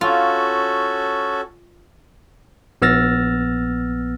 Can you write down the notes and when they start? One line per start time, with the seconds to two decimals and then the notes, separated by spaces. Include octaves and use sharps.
0.01 C#4 F4 F#4 A4
2.82 A#1 B3 E6 F6 A6 A#6